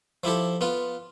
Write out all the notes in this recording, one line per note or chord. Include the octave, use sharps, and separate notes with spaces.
F3 E4 G4 A4
B3 F4